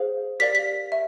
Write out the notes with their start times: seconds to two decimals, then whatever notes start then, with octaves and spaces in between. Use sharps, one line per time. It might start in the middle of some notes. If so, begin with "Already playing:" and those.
Already playing: G#4 C5 F5
0.40 G4 A#4 D5 F5 B6
0.55 B6
0.92 E5